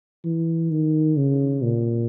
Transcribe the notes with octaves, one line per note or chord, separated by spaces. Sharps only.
E3
D#3
C#3
A#2